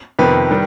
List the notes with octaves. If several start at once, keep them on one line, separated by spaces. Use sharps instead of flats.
F2 C3 D#3 B3 B4
D#3 G3